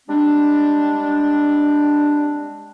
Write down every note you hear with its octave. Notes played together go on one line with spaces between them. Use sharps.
G3 G#3 C4 D4